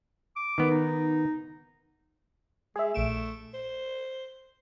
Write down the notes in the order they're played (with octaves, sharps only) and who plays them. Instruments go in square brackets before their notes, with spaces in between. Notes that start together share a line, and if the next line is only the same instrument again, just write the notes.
[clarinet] D6
[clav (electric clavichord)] D#3 B3
[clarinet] D#4
[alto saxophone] G#3 [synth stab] G#4 E5
[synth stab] A#1 D7 E7 [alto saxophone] A3
[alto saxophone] C5